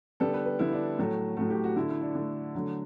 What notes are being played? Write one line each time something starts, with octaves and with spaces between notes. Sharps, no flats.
D3 G3 B3 A4
B4
B4
D3 G3 B3 E4
D4
A2 F#3 A3
A2 F#3 A3 F#4
G4
F#4
D3 A3 E4
E4
D4
D3 A3
D3 F#3 A3